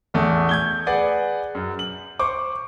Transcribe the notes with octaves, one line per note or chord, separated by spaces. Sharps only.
A1 E2 A3
G6 G#6 G7
G#4 B4 D5 F#5
F#2
F#7
C5 C#6 D6